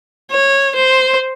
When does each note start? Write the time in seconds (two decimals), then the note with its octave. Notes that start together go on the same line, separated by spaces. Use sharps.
0.31 C#5
0.75 C5